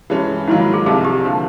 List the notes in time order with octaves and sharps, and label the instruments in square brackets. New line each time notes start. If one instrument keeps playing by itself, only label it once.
[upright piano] G2 E3 G#3 C#4
[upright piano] G#2 D#3 F#3 A#3 [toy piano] E4
[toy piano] F4
G#4
[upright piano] C2 C3 F3 [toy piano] G#4
[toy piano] G4
[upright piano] D3 F3 A#3